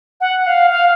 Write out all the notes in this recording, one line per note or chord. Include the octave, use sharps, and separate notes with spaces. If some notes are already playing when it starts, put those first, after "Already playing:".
F#5
F5
F5